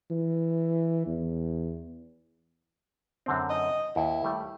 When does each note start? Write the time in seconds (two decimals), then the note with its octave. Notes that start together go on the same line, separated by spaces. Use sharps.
0.10 E3
1.06 E2
3.26 F#2 D3 C4
3.50 D#5
3.96 D#2 E4
4.24 G3 A3